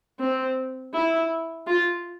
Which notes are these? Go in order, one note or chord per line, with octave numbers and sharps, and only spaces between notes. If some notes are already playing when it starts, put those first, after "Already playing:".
C4
E4
F4